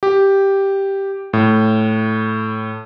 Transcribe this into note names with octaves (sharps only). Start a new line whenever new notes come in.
G4
A2